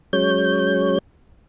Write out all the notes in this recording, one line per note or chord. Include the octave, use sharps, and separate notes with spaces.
F#3 G#3 C#4 C#5 G6